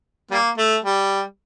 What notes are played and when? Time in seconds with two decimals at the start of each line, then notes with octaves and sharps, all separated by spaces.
0.31 G3 A#3
0.58 A3
0.84 G3